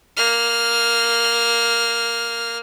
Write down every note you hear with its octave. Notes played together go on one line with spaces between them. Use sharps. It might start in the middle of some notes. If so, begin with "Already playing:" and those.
A#3 F6